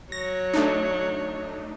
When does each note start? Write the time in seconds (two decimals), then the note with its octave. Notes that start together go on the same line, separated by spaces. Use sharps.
0.12 F#3 C#5 A#6
0.54 A3 D4 D#4